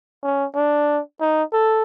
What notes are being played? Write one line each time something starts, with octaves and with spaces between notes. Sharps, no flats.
C#4
D4
D#4
A4